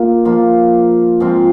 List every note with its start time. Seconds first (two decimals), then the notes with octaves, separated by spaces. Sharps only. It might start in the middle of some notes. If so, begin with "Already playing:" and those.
Already playing: A#3 F4
0.25 F3 A#3 F4
1.20 G#2 F3 C4 F4